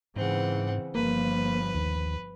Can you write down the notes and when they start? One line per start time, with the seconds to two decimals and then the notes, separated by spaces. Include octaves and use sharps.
0.16 G#2 C#3 E3 C4 F#5
0.95 G1 F3 A#3 B4
1.74 D#2